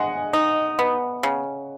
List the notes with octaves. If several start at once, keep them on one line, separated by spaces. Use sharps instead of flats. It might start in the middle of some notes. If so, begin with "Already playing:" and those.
Already playing: G#3 D#5 F#5 G#5
D#4
B3
C#3